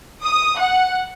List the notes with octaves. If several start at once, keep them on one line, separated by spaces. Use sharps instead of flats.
D#6
F#5